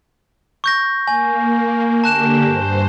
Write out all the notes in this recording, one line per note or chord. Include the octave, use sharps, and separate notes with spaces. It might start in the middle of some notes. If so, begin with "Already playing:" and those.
C#6 G6 A#6
A#3 G#5
D3 A#3 G4 A5 F#6 E7
G2 C5